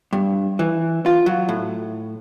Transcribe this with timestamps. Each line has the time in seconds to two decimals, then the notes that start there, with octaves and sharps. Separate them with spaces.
0.13 G2
0.59 E3
1.06 F4
1.26 F#3
1.49 A2